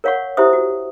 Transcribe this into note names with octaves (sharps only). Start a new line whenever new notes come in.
A#4 C#5 F5 F#5 C#6
E4 G4 C5 E5 D#6
F#4